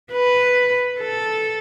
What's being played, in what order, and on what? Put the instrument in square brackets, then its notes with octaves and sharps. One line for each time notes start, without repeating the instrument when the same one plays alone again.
[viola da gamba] B4
A4